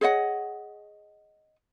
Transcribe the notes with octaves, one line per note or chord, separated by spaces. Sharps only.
G#4 C#5 D#5 F#5